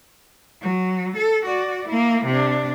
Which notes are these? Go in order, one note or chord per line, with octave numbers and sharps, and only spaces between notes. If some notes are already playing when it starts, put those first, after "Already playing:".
F#3
A4
F#4 D5
A#3 E4
C3 D4